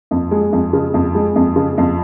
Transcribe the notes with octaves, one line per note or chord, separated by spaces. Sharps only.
F2
G#3
F2
C#3
F2
G#3
F2
C#3
F2